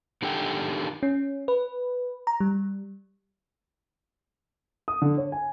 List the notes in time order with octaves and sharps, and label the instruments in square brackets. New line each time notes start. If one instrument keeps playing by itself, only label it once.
[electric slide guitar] D#3 D4 G4 A4 G5
[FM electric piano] C#4
B4
A#5
G3
[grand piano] D#6
D3
C#5
G#5